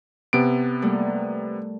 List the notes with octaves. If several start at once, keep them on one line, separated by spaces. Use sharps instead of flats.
C3 B3 D7
G3 A3 A#3